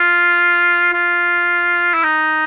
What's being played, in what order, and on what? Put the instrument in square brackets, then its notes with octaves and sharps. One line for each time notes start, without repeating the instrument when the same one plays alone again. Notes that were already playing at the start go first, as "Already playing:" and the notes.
Already playing: [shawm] F4
F4
E4
D#4